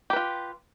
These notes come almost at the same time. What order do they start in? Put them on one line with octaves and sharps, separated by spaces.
G4 B4 F4